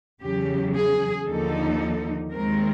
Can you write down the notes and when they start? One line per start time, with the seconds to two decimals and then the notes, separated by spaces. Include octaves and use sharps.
0.22 E2 C#3 F#3 G4
0.74 G#4
1.26 D#2 D3 F3 A#3 D#4 A4
2.32 D#2 D#3 G#3 C4 A#4